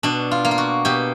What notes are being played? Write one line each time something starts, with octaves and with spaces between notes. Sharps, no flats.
B2 D4
F4
A#3
F4
F#4
B2 G4